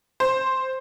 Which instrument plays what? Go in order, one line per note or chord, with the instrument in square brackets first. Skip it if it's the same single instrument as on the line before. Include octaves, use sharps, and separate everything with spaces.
[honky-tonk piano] C5